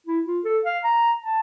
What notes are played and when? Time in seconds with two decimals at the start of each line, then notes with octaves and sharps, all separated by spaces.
0.07 E4
0.26 F4
0.45 A4
0.65 F5
0.84 A#5
1.22 A5